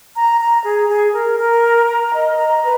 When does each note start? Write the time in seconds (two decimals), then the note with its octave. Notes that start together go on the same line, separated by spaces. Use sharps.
0.16 A#5
0.40 A#5
0.65 G#4
0.89 G#4
1.14 A#4
1.39 A#4
1.63 A#5
1.87 A#4
2.12 D#5
2.37 A#5
2.62 B4